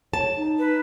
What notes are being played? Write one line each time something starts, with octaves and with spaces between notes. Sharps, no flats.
C#5 A5
D#4
B4